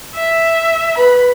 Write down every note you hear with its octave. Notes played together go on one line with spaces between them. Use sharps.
E5
B4 B5